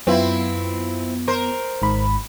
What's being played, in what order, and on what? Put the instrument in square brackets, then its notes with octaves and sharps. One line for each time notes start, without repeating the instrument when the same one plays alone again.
[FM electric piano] F#2 B3 F4 [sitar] C4 E4
[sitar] A#4 C5
[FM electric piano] G#1 G#2 B5